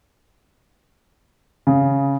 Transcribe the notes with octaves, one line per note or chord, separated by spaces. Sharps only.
C#3